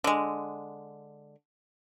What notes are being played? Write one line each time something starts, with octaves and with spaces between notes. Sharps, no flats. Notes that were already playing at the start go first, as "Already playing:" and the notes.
D3 G#3